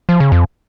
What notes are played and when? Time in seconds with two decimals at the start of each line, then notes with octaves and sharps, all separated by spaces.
0.09 F3
0.20 C#3
0.32 F2